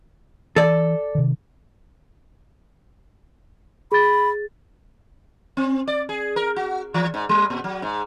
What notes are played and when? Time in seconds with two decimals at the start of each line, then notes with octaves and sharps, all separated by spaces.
0.56 E3 A4 D5
1.15 C3 D#3
3.92 G#4 B5 A6
5.57 C4
5.88 D5
6.09 G#4
6.36 A#4
6.56 F#4
6.94 E3
7.14 G#2
7.29 G3
7.50 A#2
7.64 F#3
7.82 G#2